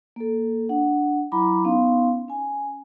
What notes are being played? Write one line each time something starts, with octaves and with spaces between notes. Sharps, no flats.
A#3 A4
D4 F#5
F#3 E4 A#5 B5 D6
B3 C#4 D#4 F5 C6
C#4 G#5